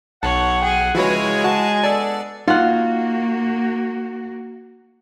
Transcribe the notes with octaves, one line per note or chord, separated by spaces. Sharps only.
B1 C#5 F#5 A5
G#4 G5
C#3 F3 G#3 E4 F#4 G#4 B4 C#5
F#4 A5
B3 D4 A4 D5 A5 E6
A#3 D#4 F4 F#4 F#5